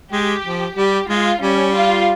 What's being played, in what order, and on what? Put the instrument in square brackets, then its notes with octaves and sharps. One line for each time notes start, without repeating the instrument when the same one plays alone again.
[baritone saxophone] G#3 [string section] G4
[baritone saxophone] F3
[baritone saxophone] G3 [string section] G4
[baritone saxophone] G#3 [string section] F4
[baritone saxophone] G3 [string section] C#4
[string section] F4